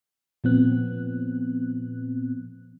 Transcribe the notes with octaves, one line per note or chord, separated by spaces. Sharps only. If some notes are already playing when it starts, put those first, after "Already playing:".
A#2 F3 B3 C4 F#6